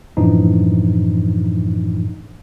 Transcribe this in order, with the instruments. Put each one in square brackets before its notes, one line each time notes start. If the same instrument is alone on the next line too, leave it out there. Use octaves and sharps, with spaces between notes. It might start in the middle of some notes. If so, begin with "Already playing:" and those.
[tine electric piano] F#2 A2 E3 F3 D4 D#4